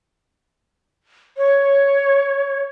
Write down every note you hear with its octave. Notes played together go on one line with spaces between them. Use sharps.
C#5